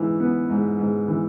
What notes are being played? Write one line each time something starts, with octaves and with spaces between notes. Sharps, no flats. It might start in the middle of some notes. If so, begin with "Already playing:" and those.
Already playing: G#2 E3
B3
G#2
G#2
E3